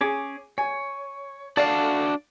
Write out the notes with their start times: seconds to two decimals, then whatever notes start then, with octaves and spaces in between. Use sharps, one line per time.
0.01 C#4 G#4 C#5 D6
0.58 C#5 G#5
1.57 D4 F#4 A4 D5 F5